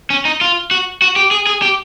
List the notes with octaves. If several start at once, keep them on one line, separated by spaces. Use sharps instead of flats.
C#4
D#4
F4
F#4
F#4
G4
G#4
G#4
G4